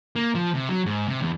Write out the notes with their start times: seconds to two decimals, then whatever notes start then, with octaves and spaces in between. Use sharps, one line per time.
0.16 A#3
0.35 F3
0.55 C3
0.69 F#3
0.86 G#2
1.08 C3
1.20 E2